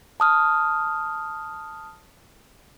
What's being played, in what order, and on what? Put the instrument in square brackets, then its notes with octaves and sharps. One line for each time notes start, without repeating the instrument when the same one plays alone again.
[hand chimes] A5 D#6 F6